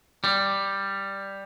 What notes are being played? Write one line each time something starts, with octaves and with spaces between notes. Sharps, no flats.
G3